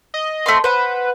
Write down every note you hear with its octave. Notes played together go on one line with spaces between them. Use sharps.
D#5
A3 C4 C6
B4 C5 F#5